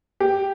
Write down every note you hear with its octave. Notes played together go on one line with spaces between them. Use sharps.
G4